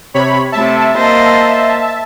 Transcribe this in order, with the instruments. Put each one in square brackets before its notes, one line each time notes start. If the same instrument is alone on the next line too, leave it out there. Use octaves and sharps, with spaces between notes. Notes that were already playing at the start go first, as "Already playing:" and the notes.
[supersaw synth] C3 C#5 B5
[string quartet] C3 A3 [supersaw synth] E5 A5
[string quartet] A#3 C5 D#5